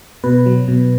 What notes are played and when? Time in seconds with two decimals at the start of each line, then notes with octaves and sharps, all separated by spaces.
0.24 B2 B4
0.46 F#3
0.68 B2